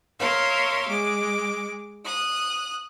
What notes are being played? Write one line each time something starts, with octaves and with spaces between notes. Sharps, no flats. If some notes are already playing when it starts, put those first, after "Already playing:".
A#4 C#5 E5 F5 C6
G#3 D6
D#6 F#6